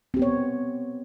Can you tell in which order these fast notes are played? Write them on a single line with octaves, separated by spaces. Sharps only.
C4 G4 B3 C#5